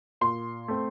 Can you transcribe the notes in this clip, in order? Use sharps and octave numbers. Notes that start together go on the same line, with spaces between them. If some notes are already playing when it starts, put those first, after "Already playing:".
A#2 C6
A3 C4